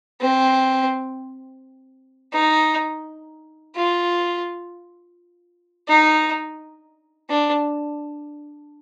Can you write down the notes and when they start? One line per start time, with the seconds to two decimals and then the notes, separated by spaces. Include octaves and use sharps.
0.21 C4
2.33 D#4
3.76 F4
5.88 D#4
7.29 D4